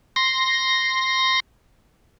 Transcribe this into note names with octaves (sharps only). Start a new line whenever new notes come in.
C6 A#6